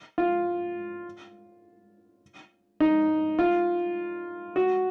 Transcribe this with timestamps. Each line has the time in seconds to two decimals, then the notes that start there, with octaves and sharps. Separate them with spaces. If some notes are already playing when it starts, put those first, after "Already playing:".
0.18 F4
2.80 D#4
3.39 F4
4.56 F#4